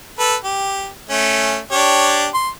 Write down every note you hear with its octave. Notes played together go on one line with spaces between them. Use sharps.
A4 B4
G4
A3 C#4
D4 G4 C#5
C6